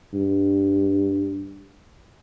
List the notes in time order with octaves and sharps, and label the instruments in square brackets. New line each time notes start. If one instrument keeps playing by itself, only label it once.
[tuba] G2